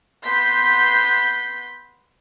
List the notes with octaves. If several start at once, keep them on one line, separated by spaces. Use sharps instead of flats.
B3 C6 G6 B6